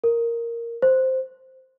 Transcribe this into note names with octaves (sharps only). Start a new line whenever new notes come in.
A#4
C5